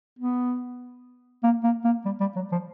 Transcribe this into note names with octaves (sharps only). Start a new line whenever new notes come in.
B3
A#3
A#3
A#3
G3
G3
F#3
F3